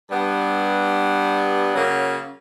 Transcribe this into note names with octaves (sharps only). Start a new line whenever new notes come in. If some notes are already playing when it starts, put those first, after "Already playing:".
G2 G3 B3
C#3 F#3 A#3